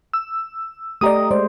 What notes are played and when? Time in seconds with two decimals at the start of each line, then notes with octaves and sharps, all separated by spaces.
0.13 E6
1.01 A3 G4 D5 D#5 A#5 D#6
1.31 G#3 C5 D5